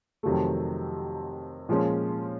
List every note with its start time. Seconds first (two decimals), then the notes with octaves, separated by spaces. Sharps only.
0.23 F2 C3 D#3 F#3 A3
1.69 A#2 F3 G#3 C#4